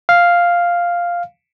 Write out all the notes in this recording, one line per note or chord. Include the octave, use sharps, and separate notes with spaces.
F5